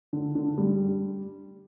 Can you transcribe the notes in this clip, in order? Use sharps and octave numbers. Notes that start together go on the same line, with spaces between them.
D3
D3
G3